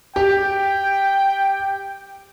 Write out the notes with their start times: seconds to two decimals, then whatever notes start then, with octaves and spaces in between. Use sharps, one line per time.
0.16 G4 G5